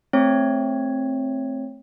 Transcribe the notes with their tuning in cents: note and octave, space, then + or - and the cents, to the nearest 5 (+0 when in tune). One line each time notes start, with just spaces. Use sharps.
A3 +0 C4 +10 C#5 +0